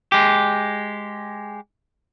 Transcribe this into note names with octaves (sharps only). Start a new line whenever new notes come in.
G#3 G4